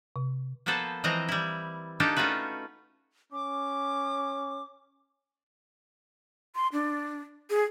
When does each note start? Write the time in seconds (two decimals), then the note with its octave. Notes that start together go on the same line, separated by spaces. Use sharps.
0.16 C3
0.66 F3 A#3 B3 A4 B4 C5
1.04 E3 F3 G#3 C4 D#5 A#5
1.29 G3 E4
2.00 A#3 D4 D#4 F4 G4 A4
2.16 A3 C#4 F4 F#4 B4
3.32 C#4 D6
6.56 C6
6.73 D4
7.50 G#4